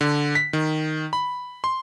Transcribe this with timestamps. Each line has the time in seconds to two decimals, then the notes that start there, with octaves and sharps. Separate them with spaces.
0.01 D3
0.35 B6
0.53 D#3
1.13 B5
1.64 C6